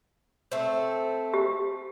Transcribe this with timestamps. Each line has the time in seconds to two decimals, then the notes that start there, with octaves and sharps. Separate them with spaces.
0.52 A3 C4
1.34 G4